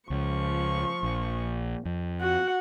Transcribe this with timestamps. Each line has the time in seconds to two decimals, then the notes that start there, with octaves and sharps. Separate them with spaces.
0.10 C#2 F3 C#6
1.03 A#1
1.85 F2
2.21 F#4 F#5